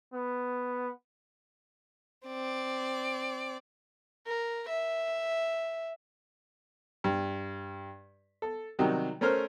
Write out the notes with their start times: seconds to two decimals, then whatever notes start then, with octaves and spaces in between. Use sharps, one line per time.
0.14 B3
2.27 C4 D5
4.27 A#4
4.69 E5
7.04 G2
8.42 A4
8.79 C3 D#3 F#3 G3
9.21 A3 C#4 A#4 C5 F6